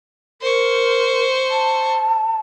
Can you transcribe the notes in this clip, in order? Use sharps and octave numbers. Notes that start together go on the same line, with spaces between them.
A#4 C5 C#6
A5